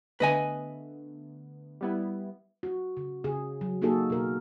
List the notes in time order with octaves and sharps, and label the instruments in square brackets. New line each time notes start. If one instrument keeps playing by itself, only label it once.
[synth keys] D3 A3 B3 [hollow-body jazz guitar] B4 D#5 G#5
[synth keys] G3 B3 E4
[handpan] F#4
C#3
C#3 G#4
F#3
A#3 D#4 F#4 G#4 A4
B2 A#4